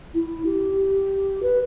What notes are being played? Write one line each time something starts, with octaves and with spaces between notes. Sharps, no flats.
E4
G4
B4